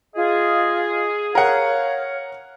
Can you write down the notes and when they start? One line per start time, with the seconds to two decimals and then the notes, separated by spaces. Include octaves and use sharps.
0.16 F4 G#4 D#5
1.35 A#4 C#5 F5 F#5